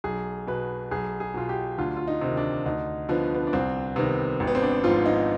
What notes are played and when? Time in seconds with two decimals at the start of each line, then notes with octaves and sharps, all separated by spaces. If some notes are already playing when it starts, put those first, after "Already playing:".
0.04 B1 G#4
0.47 B2 B4
0.91 B1 G#4
1.20 G#4
1.34 B2 F4
1.49 G4
1.78 D2 F4
1.97 F4
2.08 D#4
2.21 C3 D#3
2.37 D4
2.66 D2 D#4
3.09 D3 F3 B3
3.35 B3
3.47 D4
3.53 C2 C4
3.96 C3 D#3 B3
4.40 G#1
4.47 B3
4.55 C4
4.62 D4
4.84 G#2 F3 F4
5.06 D#4